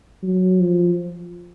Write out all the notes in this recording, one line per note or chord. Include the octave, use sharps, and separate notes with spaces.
F#3
F3